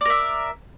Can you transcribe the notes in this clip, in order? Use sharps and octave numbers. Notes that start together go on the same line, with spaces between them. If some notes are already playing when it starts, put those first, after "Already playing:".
A#4 D5 E5